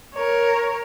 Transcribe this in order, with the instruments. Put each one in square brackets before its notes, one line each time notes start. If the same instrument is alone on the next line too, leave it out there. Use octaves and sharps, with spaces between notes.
[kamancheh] A#4 C#5